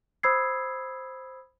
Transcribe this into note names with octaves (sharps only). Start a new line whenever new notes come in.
C5 B5 D#6 E6 G#6 C7